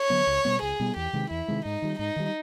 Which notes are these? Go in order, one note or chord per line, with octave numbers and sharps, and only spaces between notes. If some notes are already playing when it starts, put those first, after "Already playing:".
Already playing: C#5
D3 F#3 B3
C#2
B2 G3 B3
C#2 G#4
B2 G3 B3
E2 G4
C3 D#3 G#3
E2 E4
C3 D#3 G#3
G#2 D#4
D#3 G3
G#2 D#4
D#3 G3